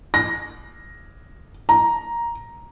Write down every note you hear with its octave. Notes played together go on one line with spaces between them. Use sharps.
A#6
A#5